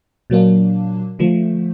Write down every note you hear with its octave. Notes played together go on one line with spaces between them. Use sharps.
A#2 F#3 A#3 D4
D3 F3 A3